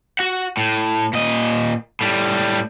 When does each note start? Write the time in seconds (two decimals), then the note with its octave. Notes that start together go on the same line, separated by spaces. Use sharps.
0.19 F#4 F#5
0.57 A2
1.13 A#2 D#5
2.01 A2 G3